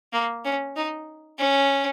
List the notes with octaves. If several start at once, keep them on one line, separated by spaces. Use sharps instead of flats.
A#3
C#4
D#4
C#4